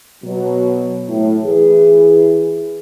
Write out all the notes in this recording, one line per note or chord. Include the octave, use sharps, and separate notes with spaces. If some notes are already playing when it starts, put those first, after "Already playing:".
B2 F#3
A2
E3 G#4